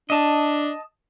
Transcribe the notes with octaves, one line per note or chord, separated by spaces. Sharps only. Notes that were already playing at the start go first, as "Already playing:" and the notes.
D4 D#5 A5